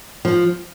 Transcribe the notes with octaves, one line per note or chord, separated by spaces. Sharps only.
F3